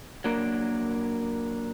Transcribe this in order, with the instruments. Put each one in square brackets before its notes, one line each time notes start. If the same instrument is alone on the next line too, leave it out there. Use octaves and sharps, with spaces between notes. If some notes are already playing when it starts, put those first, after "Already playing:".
[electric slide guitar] F#3 A#3 D4 A#4